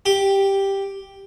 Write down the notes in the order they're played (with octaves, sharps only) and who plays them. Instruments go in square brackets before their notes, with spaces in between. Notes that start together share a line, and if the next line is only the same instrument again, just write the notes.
[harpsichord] G4